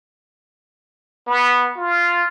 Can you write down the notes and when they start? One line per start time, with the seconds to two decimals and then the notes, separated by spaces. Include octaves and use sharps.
1.27 B3
1.76 F4